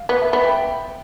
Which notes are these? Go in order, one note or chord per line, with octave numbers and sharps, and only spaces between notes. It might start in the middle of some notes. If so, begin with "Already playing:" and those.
Already playing: F5
B3
E5
B3 B5
G5